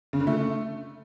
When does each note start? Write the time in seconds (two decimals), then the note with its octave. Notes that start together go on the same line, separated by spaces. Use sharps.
0.13 C#3
0.20 D3
0.27 A3